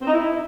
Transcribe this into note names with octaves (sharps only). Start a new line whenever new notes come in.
C4
D#4
E4